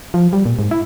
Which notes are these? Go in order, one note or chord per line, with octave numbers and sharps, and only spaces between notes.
F3
G3
A#2
G#2
E4